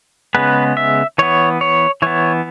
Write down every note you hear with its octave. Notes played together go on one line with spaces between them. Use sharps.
C#3 G#3 B3 B4
E5
E3 B3 C#5
C#5
E3 B3 C#5